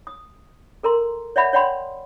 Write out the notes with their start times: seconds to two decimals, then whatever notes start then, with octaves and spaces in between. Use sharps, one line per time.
0.07 D#6
0.83 A4 A#4 A#5 C6
1.36 C#5 D5 E5 F#5 B5
1.53 C#5 D5 F#5 G5 B5 C6